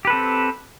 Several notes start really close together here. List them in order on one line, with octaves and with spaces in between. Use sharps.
G4 B4 A4 C4